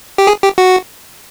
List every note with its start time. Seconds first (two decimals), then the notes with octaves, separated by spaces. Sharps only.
0.18 G4
0.27 G#4
0.43 G4
0.58 F#4